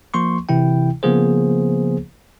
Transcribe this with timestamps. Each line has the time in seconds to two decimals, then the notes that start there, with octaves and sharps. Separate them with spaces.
0.14 F3 A#3 C6 C#6
0.49 C3 E3 E4 G5
1.03 C#3 F3 A#3 B3 G#4 C5